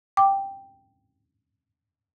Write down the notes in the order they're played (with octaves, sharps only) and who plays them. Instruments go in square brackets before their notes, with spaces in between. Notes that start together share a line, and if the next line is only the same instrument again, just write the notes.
[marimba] G5 D6